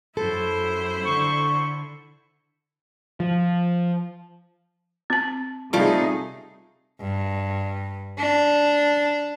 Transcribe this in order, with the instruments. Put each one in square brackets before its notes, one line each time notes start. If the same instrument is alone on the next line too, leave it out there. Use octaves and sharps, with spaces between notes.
[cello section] F#2 [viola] E4 C5 [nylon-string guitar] A4
[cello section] D3 [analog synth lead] C#6
[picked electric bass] F3
[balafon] C4 A5
[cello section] C3 D#4 G#4 [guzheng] G3 A3 [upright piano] F4
[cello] G2
D4